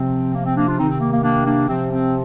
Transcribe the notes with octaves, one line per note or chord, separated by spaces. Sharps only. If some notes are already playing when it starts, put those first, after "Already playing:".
Already playing: C3 F3 C4
A#3
C4
A#3 D4
D4 F4
C3 D#3 C4 D#4
C4
A#3
A#3
A#3 D4
A#3 D4
C3 F3 C4
C4